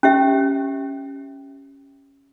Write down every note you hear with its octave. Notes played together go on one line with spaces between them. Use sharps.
C#4 G4 E5